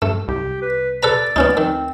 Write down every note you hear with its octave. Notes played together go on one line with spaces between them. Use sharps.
G2 A3
C2 G4
B4
A4 B4 D5 A#5
D2 B3 C#4 D#4
D#3 C4